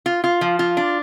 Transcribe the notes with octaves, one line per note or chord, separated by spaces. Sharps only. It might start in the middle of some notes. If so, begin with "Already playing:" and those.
F4
F4
F3
F4
D4